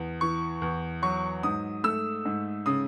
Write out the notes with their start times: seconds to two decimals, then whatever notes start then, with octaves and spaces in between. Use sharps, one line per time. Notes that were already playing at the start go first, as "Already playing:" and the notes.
Already playing: E2
0.21 E3 C#6
0.62 E2
1.02 F#3 C#6
1.43 G#2 D#6
1.84 A3 E6
2.25 G#2
2.66 C#3 D#6